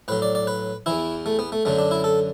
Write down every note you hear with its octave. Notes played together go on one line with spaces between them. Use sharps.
A2 F#3 B4
D5
D5
B4
E2 E3 E4
A3
B3
A3
F#2 D3 F#3 A3
D4
E4
A4